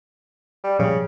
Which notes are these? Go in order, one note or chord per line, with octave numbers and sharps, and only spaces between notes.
G3
A#2 C#3 F3 G3